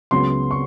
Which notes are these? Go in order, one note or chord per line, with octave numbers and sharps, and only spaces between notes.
C#2 C#3 F#3 B3 C6
C#6